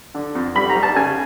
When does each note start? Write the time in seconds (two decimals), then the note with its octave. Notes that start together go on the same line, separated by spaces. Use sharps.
0.15 D3
0.35 F2
0.55 G3 B5
0.69 A#5
0.76 G3
0.83 A5
0.96 C#3 G#5